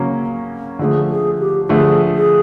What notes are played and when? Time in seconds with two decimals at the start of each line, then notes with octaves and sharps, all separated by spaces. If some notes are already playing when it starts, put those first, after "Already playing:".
Already playing: C#3 F#3 A#3 C#4
0.79 D3 F3 A3 G#4
1.10 G#4
1.39 G4
1.69 D3 F3 A3 G#4
2.15 G#4